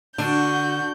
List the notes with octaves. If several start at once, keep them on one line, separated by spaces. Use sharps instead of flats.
D3 D4 F#4 G6